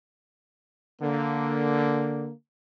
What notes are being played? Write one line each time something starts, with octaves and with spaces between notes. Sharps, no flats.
D3 A#3